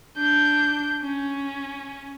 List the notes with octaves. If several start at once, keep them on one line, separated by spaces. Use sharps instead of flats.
D4 G6
C#4